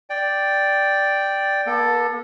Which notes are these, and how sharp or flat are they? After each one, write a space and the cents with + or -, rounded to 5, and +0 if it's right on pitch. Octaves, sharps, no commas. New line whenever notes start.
D5 +0 G5 +0
A#3 +45 A4 +0